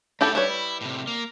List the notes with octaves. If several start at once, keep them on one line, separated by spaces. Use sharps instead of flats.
A3 E4 G4 A4 B5
G3 E4 B4 C#5
A2 C3
A#3